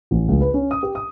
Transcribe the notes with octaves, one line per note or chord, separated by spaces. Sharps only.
A1
C#2
B4
C#4
D#6
G4
D#6